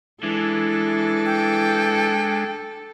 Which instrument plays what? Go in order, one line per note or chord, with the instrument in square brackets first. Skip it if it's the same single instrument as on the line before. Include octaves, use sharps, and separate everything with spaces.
[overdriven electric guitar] E3 [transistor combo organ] G#3 D4 [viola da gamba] A4
[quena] G5